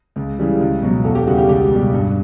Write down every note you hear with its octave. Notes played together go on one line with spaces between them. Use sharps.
C#2
C#3 E3 G3
C#2
B2 F#3
E2 A4
G4
C#3 G3 F#4
G4
C#2 G4
B2 G3
G2